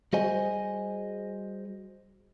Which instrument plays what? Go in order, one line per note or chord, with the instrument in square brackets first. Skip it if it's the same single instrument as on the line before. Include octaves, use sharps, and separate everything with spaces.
[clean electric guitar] G3 F#4 G#4 C5 D#5 G#5